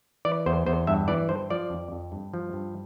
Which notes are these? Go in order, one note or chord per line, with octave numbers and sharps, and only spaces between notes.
E3 D5
E2 C5
E2 C5
G2 E5
E3 D5
G2 C5
F3 D5
F2
F2
G2
F3
G2